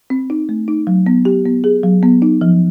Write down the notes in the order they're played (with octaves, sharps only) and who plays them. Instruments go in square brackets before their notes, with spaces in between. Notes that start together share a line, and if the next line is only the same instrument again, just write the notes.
[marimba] C4
D#4
A3
D#4
F#3
B3
G4
B3
G#4
F#3
B3
D#4
F3